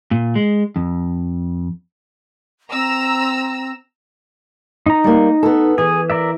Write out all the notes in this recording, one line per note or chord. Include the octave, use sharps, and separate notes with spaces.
A#2
G#3
F2
C4 A#5 E6
D#4 A#5
G3 A#3
B3 A4
E3 G#4
A#4 D5 E5